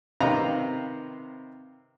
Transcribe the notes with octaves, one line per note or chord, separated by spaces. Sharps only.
C3 D#3 C4 B4 F5 A#5